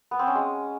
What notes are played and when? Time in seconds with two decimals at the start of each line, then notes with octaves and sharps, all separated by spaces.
0.11 B3
0.19 C4
0.27 C#4
0.35 G#3